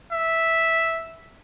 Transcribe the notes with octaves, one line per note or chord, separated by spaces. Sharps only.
E5